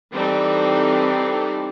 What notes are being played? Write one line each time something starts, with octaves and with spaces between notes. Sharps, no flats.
E3 G3 C4 D#4 A4